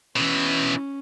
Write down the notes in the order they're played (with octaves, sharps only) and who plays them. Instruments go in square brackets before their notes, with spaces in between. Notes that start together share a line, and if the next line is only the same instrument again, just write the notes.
[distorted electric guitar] B2 E3 [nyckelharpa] C#4